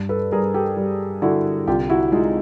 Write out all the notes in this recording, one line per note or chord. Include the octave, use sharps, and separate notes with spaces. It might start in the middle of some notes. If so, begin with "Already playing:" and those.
Already playing: G2
A4 B4
G2 G#4 A#4
G4 A4
G3
D3 E4 F#4
C2 F4 G4
E4 F#4
G#3 D#4 F4